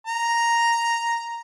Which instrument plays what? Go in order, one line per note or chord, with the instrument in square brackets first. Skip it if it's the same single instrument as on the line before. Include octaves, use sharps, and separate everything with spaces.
[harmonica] A#5